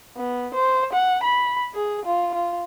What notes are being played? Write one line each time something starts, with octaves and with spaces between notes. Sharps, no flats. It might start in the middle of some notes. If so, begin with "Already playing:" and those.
B3
C5
F#5
B5
G#4
F4
F4